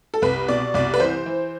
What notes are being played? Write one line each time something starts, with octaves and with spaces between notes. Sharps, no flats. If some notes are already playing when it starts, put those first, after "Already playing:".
A4
C2 B4
B2 D5
C2 D5
B4
E3 C5
E3